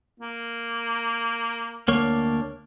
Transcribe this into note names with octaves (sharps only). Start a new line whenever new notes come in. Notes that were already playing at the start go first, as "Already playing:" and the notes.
A#3
D2 A#3 D4 C#5